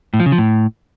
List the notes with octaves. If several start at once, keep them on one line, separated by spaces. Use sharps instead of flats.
A2
F3
C#3
F3
A2